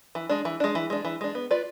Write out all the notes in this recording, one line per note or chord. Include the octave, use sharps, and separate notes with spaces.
E3
G#3 D4
E3
G#3 D4
E3
G#3 D4
E3
G#3 D4
B3
F4 B4 D5